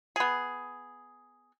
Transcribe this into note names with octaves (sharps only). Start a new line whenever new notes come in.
B3 G#4